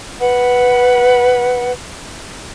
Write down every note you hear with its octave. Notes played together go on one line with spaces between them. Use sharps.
B4 F#5 B5